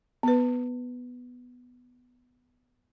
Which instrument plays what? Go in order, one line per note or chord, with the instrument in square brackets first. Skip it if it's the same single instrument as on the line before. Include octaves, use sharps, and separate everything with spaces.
[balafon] B3 B4